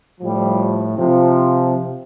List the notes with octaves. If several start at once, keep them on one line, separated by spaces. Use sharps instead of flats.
A2 F3 G3
C3 F3